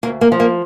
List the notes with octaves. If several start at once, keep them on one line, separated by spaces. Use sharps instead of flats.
D2 A#3
A#3
F3
A#3